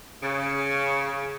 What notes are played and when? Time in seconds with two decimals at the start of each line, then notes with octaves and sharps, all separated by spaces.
0.22 C#3